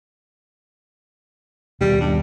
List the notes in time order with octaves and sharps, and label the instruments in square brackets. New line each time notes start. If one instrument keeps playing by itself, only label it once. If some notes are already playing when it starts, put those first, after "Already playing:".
[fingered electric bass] D#2 B2 [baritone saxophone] G3
[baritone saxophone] G2